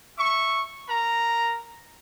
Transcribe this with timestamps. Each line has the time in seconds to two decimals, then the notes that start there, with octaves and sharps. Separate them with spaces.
0.18 E5 C#6
0.89 A#4 A#5